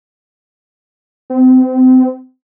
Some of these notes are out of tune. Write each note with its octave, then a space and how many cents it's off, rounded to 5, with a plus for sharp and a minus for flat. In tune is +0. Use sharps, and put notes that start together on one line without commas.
C4 -30